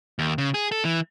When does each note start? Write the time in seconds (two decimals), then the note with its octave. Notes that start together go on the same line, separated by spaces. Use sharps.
0.19 D#2
0.38 C#3
0.54 G#4
0.72 A4
0.85 E3